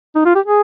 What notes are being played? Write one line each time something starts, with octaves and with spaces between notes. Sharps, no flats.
D#4
F4
G4
G#4